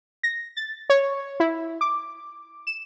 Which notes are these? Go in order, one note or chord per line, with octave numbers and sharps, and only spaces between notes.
A#6
A6
C#5
E4
D6
E7